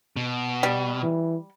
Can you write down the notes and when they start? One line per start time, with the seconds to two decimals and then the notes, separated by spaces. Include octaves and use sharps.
0.16 B2
0.63 G3
1.03 E3